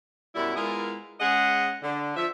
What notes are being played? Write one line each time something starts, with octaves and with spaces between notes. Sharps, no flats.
F#2 B2 G3 E4
G#3 B3 E4 F4 G#4 A#4
G#3 C#4 G#4 D#5 F#5
D3
F3 E5